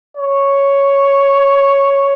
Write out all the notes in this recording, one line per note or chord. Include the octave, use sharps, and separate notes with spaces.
C#5